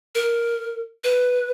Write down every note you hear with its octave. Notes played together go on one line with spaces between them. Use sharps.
A#4
B4